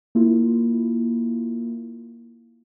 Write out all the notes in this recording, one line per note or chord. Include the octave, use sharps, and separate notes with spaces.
A#3 E4 F4